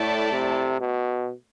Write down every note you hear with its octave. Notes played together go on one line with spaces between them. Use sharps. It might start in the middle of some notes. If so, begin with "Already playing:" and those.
Already playing: A2 A3 E4 A4 D5 A5
C3
B2